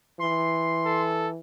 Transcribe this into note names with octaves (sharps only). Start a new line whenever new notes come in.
E3 C6
A4